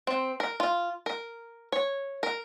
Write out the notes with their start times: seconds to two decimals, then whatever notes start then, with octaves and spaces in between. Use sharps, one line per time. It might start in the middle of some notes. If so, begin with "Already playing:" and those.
0.07 C4
0.40 A#4
0.60 F4
1.06 A#4
1.72 C#5
2.23 A#4